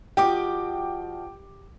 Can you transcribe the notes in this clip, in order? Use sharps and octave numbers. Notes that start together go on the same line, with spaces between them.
F3 F#4 G4 D#5 G5 D6